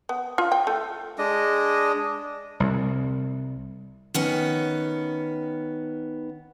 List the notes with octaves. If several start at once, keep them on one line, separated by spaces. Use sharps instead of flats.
B3
F4
G5
A3
G#3 D4 D#5
C2
D#3 B3 C#4